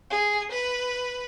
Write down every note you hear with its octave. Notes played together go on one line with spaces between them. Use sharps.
G#4
B4